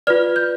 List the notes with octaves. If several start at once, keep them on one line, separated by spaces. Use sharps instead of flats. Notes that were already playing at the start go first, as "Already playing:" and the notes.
F4 B4 D5 F6
G6